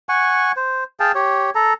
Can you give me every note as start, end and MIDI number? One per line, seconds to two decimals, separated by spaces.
0.09 0.52 78
0.09 0.52 80
0.09 0.52 85
0.57 0.84 72
1.00 1.12 68
1.00 1.12 77
1.00 1.12 79
1.00 1.12 81
1.15 1.50 67
1.15 1.50 73
1.55 1.73 69
1.55 1.73 82